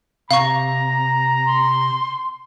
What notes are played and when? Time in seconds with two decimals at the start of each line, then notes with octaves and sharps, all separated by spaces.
0.31 C3 F5 A#5 C#6
1.46 C6